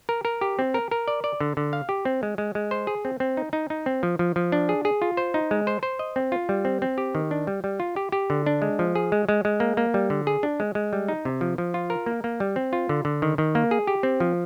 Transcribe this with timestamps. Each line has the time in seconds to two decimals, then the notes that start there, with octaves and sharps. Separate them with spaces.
0.09 A#4
0.25 A#4
0.41 G4
0.59 C4
0.74 A#4
0.91 A#4
1.08 D5
1.24 D5
1.41 D3
1.57 D3
1.73 F5
1.89 G4
2.05 C4
2.23 G#3
2.38 G#3
2.55 G#3
2.71 C5
2.87 G#4
3.05 C4
3.20 C4
3.37 D#4
3.53 D#4
3.70 D#4
3.86 C4
4.03 F3
4.19 F3
4.36 F3
4.52 D4
4.69 G#4
4.85 G#4
5.02 F4
5.17 C5
5.34 D#4
5.51 G#3
5.67 C5
5.83 C5
5.99 D#5
6.16 C4
6.32 F4
6.49 G3
6.65 C4
6.82 C4
6.98 G4
7.15 D#3
7.31 D4
7.47 G3
7.64 G3
7.80 F4
7.96 G4
8.12 G4
8.30 D3
8.46 D4
8.62 G#3
8.79 F3
8.95 G#4
9.12 G#3
9.29 G#3
9.45 G#3
9.60 A#3
9.77 A#3
9.94 G3
10.10 D3
10.27 G#4
10.43 D4
10.60 G#3
10.75 G#3
10.93 G3
11.08 D#4
11.25 C3
11.41 F3
11.58 F3
11.74 F4
11.90 A#4
12.06 A#3
12.24 A#3
12.40 G3
12.56 C4
12.73 F4
12.89 D3
13.05 D3
13.22 D#3
13.38 D#3
13.55 A#3
13.71 G#4
13.87 G4
14.03 C4
14.20 F3